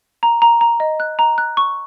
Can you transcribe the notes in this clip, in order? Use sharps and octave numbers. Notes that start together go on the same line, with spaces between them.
A#5
A#5
A#5
D#5
F#6
A#5
F#6
C#6